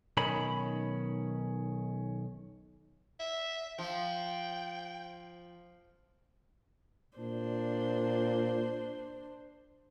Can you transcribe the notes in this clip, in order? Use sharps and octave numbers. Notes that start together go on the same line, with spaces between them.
B1 D#3 C#4 B5
E5
F3 G5
A#2 D4 C5